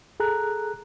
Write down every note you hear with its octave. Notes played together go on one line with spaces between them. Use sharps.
G#4 A4 A#5 F#6